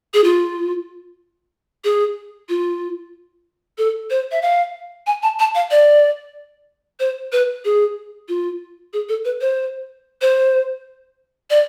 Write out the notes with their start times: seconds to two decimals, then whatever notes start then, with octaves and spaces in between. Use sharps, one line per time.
0.14 G#4
0.24 F4
1.84 G#4
2.49 F4
3.78 A4
4.10 C5
4.32 E5
4.42 F5
5.07 G#5
5.23 A5
5.40 A5
5.55 F5
5.71 D5
7.00 C5
7.32 B4
7.65 G#4
8.28 F4
8.93 G#4
9.09 A4
9.25 B4
9.41 C5
10.22 C5
11.50 D5